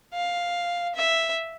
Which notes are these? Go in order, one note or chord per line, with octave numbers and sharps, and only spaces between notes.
F5
E5